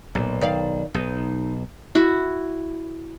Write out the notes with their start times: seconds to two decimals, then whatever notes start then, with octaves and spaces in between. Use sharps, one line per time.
0.15 B1 A#2
0.41 D#3 D5 F5
0.94 B1 D#4
1.95 E4 F#4